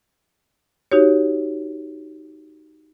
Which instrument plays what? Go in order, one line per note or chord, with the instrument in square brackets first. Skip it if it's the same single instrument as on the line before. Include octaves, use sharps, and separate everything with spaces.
[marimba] D#4 F#4 G4 C#5